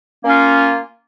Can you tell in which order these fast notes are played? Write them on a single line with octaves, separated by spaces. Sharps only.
A#3 C#4 F4